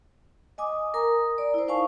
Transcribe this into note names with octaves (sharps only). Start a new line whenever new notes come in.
D#5 G#5 D6 D#6
A#4 A#5 D#6
D5
E4 C5
D#4 C5 F5 G#5 A5 C#6